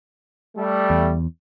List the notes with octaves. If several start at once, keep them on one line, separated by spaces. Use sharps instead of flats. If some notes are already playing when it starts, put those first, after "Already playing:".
G3 A3
E2